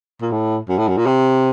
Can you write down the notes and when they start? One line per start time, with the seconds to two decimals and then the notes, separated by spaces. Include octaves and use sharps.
0.21 A#2
0.32 A2
0.69 F#2
0.79 A2
0.88 F#2
0.97 A#2
1.07 C3